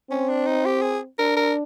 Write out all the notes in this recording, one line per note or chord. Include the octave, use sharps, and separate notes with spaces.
C4 C#4
D4
D#4
G4
G#4
D4 A#4
A#4